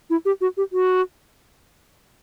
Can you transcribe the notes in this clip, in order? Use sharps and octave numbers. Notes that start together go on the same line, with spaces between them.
E4
G4
F#4
G4
F#4